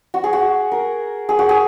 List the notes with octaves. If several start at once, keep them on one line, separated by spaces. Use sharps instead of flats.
F#4
G#4
F#4
A#4
G#4
F#4
G#4